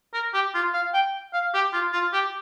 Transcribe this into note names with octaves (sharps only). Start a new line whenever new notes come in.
A#4
G4
F4
F5
G5
F5
G4
F4
F4
G4